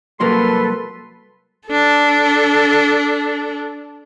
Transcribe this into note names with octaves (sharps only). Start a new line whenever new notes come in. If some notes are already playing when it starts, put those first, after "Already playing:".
C2 F#3 A#3 A4 B4 C6
D4 A4